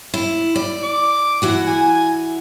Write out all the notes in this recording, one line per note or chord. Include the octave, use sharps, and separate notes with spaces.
E4
D5
D6
E3 F#4 F#5
G#5